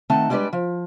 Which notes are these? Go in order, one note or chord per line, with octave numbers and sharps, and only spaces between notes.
D#3 A3 C4 D#4 F#5 A5
G3 G#3 D4 G4 B4 D5
F3